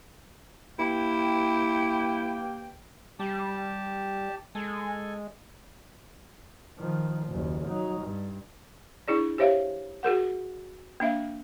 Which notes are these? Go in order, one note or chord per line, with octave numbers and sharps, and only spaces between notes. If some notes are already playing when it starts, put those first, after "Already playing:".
G2 A#3 E4 G5
G3 G4 A5
G#3 A4 G#5
D#3 F3
F#1 D#2
F#3 D#4
G2
D4 E4 G#4 D5
G4 C5 C#5 E5 F5
F#4 G#4 A#4 F#5
A#3 D4 E5 F5